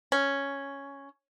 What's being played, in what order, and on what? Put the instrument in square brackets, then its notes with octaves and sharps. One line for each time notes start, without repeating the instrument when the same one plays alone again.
[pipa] C#4